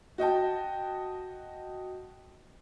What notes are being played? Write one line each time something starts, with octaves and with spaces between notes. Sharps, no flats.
F#4 D#5 G5 A5